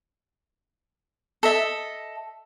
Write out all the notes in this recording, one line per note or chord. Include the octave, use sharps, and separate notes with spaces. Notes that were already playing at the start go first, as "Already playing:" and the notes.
A4 D#5 E5